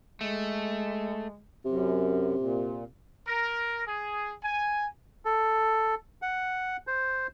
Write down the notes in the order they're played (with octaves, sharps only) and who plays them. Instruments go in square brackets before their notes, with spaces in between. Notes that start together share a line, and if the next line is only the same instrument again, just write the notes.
[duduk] G#3 [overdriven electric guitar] A3
[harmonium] F#2 [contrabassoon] C3
[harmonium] A#2
[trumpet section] A#4
G#4
G#5
[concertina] A4
F#5
C5